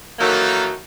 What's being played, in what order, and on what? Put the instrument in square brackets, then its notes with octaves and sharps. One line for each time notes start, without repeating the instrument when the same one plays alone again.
[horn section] D#3 E3 F#3 A#3 D#4 A4